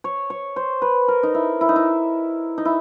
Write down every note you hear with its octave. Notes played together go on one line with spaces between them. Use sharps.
C#5
C#5
C5
B4
A#4
D#4
E4
E4
D#4
E4
D#4
E4